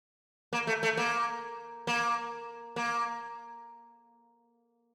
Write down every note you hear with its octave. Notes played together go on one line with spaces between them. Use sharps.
A#3
A3
A3
A#3
A#3
A#3